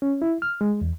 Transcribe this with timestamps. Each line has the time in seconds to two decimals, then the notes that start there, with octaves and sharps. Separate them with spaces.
0.02 C#4
0.22 E4
0.42 F6
0.61 G#3
0.81 E2